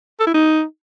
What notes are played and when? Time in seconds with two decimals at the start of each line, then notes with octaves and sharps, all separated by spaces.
0.20 A4
0.27 E4
0.34 D#4